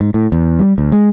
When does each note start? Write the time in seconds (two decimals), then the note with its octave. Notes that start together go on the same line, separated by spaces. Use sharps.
0.01 G#2
0.14 A2
0.32 E2
0.59 G3
0.78 D2
0.92 G#3